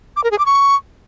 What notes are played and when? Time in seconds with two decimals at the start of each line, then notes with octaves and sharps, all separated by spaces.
0.16 D6
0.24 A#4
0.31 G#4
0.39 D6
0.46 C#6